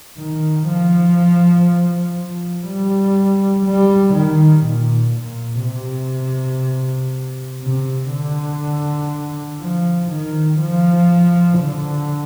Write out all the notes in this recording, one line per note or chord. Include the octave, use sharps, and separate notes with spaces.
D#3
F3
F3
G3
G3
D#3
A#2
A#2
C3
C3
D3
F3
D#3
F3
D3